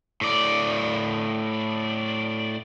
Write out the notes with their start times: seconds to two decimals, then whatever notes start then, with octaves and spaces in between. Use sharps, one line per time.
0.21 A2 D5